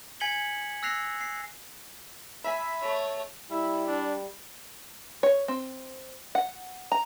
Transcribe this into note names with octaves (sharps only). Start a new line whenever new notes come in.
G#5 G#6 B6 C#7 F#7 G7
E6 F#6 A#6 C7 F7
C7
E5 G#5 B5
A3 C#5
G3 E4 E5
D4
C#5
C4
F#5
A#5